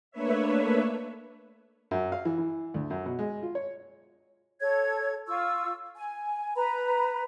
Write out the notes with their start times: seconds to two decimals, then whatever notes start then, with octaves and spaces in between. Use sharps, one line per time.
0.11 A3 A#3 D4 B4 C#5 E5
1.91 F#2
2.12 F5
2.25 E3
2.38 E3
2.74 D2
2.90 F#2
3.06 B2
3.19 G#3
3.43 F4
3.55 C#5
4.61 A4 C#5 G#6
5.27 F4 C#6 E6
5.96 G#5
6.56 B4 A#5 B5